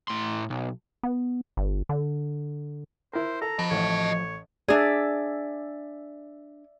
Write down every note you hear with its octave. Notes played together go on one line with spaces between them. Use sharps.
A2 C6
B1
B3
G1
D3
E4 A#4 C5
A4 A#5
F3 D#5 A5 B5
A1 A2 C#5
D4 G#4 D5 E5